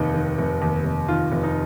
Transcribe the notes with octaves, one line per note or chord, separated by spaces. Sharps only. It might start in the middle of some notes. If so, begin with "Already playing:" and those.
Already playing: F1 D#2 D#4
D#3
F1
D#2
F1
D#3 F4
F1
D#4